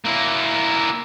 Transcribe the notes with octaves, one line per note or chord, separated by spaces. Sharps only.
A#3 E4